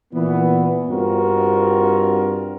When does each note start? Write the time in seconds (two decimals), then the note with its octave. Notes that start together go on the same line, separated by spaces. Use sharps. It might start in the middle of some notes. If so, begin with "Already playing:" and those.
0.13 A#2 E3 B3
0.89 G2 C4 F4 F#4 A#4